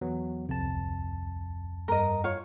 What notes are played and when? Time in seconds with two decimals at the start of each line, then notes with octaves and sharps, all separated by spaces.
0.01 E2 F#3 B3
0.49 D1 C2 F2 C3 A5
1.88 G2 A#4 D#5
2.24 F4 C#5